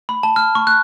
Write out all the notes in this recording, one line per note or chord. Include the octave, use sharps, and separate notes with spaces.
B5
A5
F6
C#6
F#6